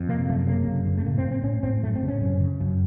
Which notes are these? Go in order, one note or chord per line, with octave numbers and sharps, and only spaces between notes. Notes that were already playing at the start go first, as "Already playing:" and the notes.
Already playing: F2
C3 A#3
F#2 A3
C#3 A#3
F#2
C#3
A3
A2 A#3
C4
A2
C4
A2 C#4
A2 C4
F#2 A3
C4
C#3
C#4
F#2
C#3
F#2